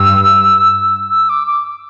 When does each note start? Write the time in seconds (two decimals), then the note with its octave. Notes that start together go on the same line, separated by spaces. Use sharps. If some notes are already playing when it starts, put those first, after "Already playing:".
Already playing: G2 E6
1.10 E6
1.29 D6
1.47 D6